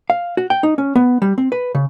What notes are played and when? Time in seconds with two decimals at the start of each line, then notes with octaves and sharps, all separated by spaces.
0.10 F5
0.37 F#4
0.50 G5
0.63 D#4
0.78 C#4
0.96 B3
1.22 G3
1.38 C4
1.52 B4
1.75 C#3